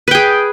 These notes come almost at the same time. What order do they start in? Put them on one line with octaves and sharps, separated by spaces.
B4 G5 G#4